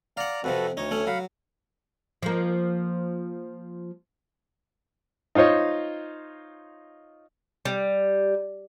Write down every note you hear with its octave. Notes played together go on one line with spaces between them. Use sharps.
D5 F5 F#5 A#5
F2 C3 F3 F#4 A4 B4
D2 D#4 C#5
A3 C#4
F#3 F5 F#5 B5
F3 A#3
D#4 F4 C5 C#5 D#5
G3